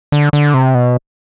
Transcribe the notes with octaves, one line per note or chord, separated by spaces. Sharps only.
D3
D3
C3
B2